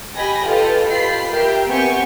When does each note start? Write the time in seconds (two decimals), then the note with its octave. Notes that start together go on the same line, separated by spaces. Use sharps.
0.14 G4 D#5 G#5 B5 A#6
0.44 F4 G4 A4 B4 D#5 F5
0.88 F4 G4 B5 C7
1.30 G4 A#4 E5 G5
1.68 B3 C4 G4 G#5 C#6